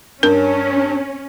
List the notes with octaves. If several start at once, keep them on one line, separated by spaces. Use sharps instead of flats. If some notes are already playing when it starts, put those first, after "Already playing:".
G2 C#4 A#4